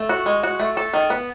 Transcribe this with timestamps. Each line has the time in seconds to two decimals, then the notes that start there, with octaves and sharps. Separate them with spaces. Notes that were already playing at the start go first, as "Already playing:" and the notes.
Already playing: A3
0.09 F#4
0.26 G#3
0.43 F#4
0.60 A3
0.77 A4
0.94 D#3
1.10 B3